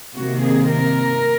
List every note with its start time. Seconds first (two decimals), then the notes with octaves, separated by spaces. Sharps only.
0.15 C3 D#3 A#3 F#4
0.44 G#4
0.72 A#4